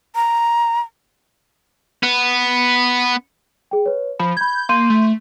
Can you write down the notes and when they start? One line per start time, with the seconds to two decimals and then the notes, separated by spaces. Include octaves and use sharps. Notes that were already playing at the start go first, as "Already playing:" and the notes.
0.15 A#5
2.03 B3
3.71 G#4 G5
3.86 B4 C#5
4.19 F3 B5
4.37 B5 G6 G#6
4.69 A#3 C6 G6 D#7
4.90 A3